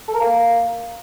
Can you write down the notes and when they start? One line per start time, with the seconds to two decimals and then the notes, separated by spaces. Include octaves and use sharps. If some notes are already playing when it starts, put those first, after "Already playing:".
0.08 A4
0.14 A#4
0.21 A#3